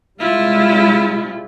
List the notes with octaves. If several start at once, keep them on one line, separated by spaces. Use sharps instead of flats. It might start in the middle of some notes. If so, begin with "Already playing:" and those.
C3 G3 G#3 E4 F4